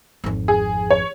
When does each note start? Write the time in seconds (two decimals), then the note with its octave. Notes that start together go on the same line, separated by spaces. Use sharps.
0.24 G#1 F2
0.48 G#4
0.91 C#5